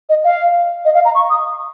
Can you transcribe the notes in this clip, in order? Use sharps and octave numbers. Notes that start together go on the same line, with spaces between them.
D#5
F5
D#5
F5
A#5
C#6
D#6